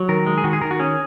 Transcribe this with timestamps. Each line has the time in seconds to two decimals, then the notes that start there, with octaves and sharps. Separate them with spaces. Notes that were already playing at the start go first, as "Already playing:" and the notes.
Already playing: F#3
0.09 D#3 A#4
0.26 G#3
0.38 G#4
0.44 D#3 F#4
0.53 G#4
0.61 D#3 A#4
0.71 F#4
0.79 C#4 G#4